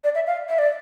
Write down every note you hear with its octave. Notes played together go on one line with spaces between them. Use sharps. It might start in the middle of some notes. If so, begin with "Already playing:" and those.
D5
E5
F5
E5
D5